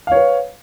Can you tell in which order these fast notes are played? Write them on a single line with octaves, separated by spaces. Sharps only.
F5 C#5 B4